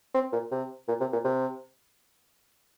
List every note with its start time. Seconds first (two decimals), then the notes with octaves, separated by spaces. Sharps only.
0.14 C4
0.32 A#2
0.51 C3
0.88 A#2
1.00 C3
1.13 A#2
1.24 C3